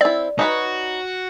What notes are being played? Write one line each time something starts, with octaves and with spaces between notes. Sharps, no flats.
C4 E4 D5
D#4 F#4 B4 C#5